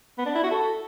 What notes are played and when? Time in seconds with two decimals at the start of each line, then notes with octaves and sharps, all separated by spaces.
0.18 B3
0.26 D4
0.35 E4
0.44 F#4
0.51 A4